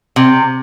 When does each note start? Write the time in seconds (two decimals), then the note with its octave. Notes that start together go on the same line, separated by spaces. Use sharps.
0.16 C3